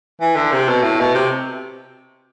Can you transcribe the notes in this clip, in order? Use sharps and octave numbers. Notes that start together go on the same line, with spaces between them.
E3
D3
C3
B2
A2
B2
C3